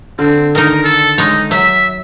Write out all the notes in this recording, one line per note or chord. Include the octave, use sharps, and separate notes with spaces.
D3 C4
D#3 D#4 A#4
A4
G#3 D#4 C#5
F#3 E5